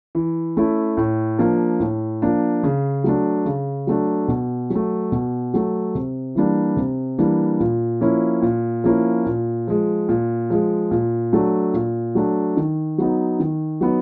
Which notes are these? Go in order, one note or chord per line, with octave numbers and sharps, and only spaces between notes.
E3
A3 C#4 E4
A2
F3 A#3 D4
A2
F3 A#3 D4
C#3
F#3 A3 D4
C#3
F#3 A3 D4
B2
F#3
A3
B2
F#3 A3
C3
E3 G3 A#3 D4
C3
E3 G3 A#3 D4
A#2
F3 A#3 C#4 E4
A#2
F3 A#3 C#4 E4
A#2
F3 G#3
A#2
F3 G#3
A#2
F#3 A3 D4
A#2
F#3 A3 D4
D#3
F#3 B3 D#4
D#3
F#3 B3 D#4